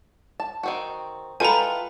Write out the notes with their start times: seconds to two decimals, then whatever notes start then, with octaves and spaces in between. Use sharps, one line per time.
0.40 A5
0.63 D#3 C4 F#4
1.40 G#3 E4 F4 A4 B4 G5 G#5 A#5